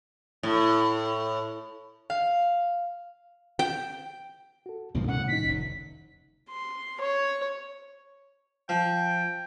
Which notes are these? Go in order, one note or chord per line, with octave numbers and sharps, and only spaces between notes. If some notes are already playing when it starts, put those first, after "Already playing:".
A2
F5
G5
F#4 A4
C#2 G2 B2 D#3 F3 A#3
C2 A2 C#4 F#5
D#3 D#4 B6
F1
C6
C#5
F3 G5